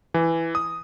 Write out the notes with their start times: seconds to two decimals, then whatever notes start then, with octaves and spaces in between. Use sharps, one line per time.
0.14 E3
0.55 D#6